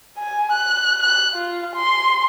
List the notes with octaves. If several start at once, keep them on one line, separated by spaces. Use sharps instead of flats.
G#5
F#6
F#6
F4
C6